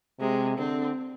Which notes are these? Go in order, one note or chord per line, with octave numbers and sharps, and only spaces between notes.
C3 G#3
D3 C4